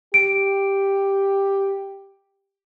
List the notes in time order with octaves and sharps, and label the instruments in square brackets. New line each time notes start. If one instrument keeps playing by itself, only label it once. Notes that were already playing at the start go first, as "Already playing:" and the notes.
[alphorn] G4 [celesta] D7